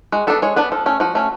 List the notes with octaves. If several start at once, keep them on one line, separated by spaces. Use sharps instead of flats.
G#3 F#4
B3 D4 A4
G#3 C#5
B3 D4 B4
F3 A4
A3 C#4
F3 F#4
A3 C#4